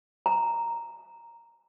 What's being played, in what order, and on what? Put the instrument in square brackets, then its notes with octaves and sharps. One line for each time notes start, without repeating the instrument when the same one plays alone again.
[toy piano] A#5